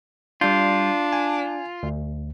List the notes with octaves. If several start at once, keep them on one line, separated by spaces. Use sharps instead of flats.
G3 D4 F4 G6
G#5
D2